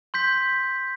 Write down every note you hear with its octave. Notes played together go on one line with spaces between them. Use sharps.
C6 G6 B6